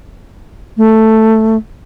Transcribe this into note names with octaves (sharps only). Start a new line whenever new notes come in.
A3